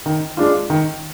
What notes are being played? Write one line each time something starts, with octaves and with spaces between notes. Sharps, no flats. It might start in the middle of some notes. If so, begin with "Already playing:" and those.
D#3
G#3 D4 F4
D#3